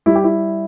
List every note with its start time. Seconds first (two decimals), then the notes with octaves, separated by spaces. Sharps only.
0.06 G3 E4
0.15 G4
0.24 E4